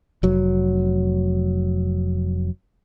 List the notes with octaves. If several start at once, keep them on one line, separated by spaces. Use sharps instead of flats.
F1 F#3